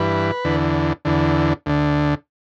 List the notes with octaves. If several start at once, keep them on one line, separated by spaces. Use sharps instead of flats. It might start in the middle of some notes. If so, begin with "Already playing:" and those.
Already playing: G2 E3 B4
E2 D3
E2 D3
D2 D3